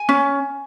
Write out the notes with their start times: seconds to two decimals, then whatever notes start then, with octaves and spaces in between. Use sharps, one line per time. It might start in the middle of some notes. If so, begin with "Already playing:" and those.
Already playing: G#5
0.09 C#4